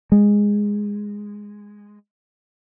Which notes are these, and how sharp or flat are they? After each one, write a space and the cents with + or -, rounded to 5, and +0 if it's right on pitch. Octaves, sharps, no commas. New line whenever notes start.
G#3 -10